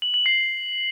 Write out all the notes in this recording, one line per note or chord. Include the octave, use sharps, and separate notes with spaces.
F#7
F#7
C7